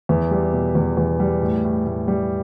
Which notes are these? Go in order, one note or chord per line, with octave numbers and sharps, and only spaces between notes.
E2
G3
B2
E2
E2
G3
A2
A2
A2
G3